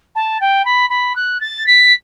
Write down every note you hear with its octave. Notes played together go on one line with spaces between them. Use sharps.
A5
G5
B5
B5
F#6
A6
B6